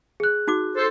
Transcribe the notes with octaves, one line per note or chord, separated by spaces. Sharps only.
G#4 F#6
D#4 F#4 D6
A4 C5